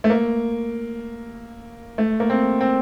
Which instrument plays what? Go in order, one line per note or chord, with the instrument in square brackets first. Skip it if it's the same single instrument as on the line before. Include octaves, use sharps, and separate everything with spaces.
[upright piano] A3
A#3
A3
A#3
C4
C4